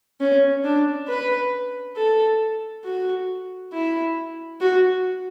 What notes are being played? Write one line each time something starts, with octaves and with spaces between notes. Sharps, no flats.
C#4
D4
B4
A4
F#4
E4
F#4